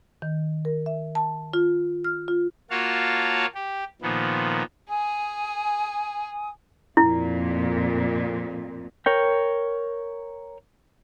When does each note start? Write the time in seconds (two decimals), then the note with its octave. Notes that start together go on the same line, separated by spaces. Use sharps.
0.22 D#3
0.65 A#4
0.86 E5
1.15 A5
1.53 F4
2.04 F6
2.28 F4
2.70 A#3 F4 F#4 C#5 F5 A5
3.54 G4
4.02 A#2 D#3 F3 B3
4.90 G#4 G#5 D#6
6.97 F2 A#2 E4
9.06 A#4 C#5 G5